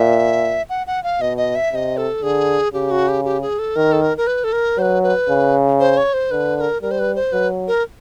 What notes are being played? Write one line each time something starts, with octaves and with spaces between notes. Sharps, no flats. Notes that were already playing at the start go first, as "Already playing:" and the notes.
Already playing: A#2 E5
F#5
F#5
F5
B2 D#5
D#5
E5
C3 D#5 E5
A4
D3 G#4
C#3 G4
F#4
G4
G4
G#4
A4
D#3 A#4
A4
A#4
A#4
B4
A4
A#4
F#3 B4 C5
B4
C#3
C5
C#5
C5
D3 B4
B4
A#4
G3 A#4
C5
B4
C5
F#3 B4
A#4